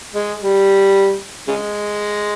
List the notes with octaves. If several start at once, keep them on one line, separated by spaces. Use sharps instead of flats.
G#3
G3
C#3 G#3